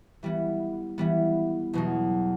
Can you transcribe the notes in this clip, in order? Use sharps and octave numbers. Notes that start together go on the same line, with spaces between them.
E3 G3 B3
E3 G3 B3
E2 B2 F#3